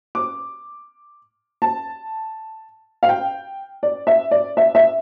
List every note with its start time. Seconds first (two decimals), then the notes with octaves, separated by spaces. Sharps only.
0.15 D6
1.62 A5
3.03 F5
3.09 G5
3.83 D5
4.07 E5
4.31 D5
4.57 E5
4.75 E5